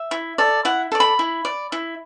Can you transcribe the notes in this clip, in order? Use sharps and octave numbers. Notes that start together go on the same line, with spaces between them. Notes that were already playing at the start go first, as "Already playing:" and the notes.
Already playing: E5
E4
A4 D5
E4 F#5
A4 D5
B5
E4
D5
E4